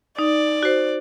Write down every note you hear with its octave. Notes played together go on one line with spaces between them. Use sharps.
D#4 D5
F#4 C5